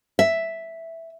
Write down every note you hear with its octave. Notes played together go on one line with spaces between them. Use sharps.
E5